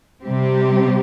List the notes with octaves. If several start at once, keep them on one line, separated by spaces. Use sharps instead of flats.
C3 G3 C4 G4